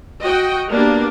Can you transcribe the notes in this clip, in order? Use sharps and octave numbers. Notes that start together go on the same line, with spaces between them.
F#4 D#5 G5
A#3 B3 D4 G4